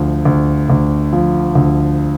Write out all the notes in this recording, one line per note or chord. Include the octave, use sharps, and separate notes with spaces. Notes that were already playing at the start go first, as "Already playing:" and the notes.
Already playing: D2 F3
D2
D2
F3
D2